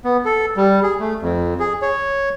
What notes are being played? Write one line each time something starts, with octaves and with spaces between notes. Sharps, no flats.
B3
A4
G3
G#4
A3
F2
G#4
C#5